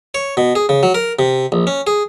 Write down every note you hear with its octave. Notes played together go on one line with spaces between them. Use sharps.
C#5
B2
G#4
C#3
F#3
A#4
C3
A#1
C#4
G#4